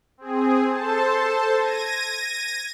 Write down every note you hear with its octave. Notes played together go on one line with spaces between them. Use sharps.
C4 G#4
A4 C5 A5
G#6 A#6 D#7